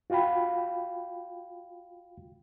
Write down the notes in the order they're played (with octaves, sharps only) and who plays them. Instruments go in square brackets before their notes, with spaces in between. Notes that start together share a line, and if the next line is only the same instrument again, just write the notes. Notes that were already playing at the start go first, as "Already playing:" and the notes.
[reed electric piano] F4 F#4 F5 G5 B5